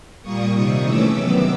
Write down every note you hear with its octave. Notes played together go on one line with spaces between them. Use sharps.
A#2 G3 A#3 C#6 D#6
C3 D#3 G3 C4
C#3 E3 A3 C#4 D6 E6
C3 D#3 F#3 B3